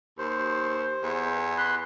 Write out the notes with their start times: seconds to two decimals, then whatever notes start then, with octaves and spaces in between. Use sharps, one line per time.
0.18 D#2 C5
1.03 E2
1.58 B5 C6 F#6